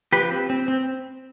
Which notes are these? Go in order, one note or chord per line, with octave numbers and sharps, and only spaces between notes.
F3 G4 B4
C4
C4
C4